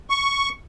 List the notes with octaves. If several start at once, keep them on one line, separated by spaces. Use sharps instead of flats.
C#6